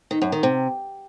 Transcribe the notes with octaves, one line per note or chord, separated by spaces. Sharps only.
D#3
F#2
D#3
C3